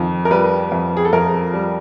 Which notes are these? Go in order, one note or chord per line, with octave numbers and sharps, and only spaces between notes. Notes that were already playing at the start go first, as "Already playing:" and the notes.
Already playing: F2 D#3
A#4
G3 B4
F2
G#4
A4
F2 A#4
G3